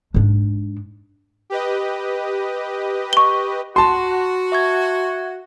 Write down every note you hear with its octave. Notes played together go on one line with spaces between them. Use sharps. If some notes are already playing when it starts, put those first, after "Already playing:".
G#2 D4
G4 B4 D#5
C#6 G7
F#4 A5 C6
E5 C#6 G#6